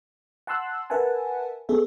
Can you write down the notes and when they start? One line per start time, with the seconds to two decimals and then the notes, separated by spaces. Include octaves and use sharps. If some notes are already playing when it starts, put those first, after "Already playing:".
0.47 F#5 A5 C6 E6 F#6
0.90 A#4 B4 E5 F#5 G#5 A5
1.69 B3 G#4 A4 E5